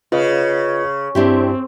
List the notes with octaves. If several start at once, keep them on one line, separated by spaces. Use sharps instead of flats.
C#3 F4 B4 D#5
G2 C4 D4 E4 G4